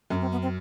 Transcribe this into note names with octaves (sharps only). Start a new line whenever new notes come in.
F#2 C#4
C4
B3
C4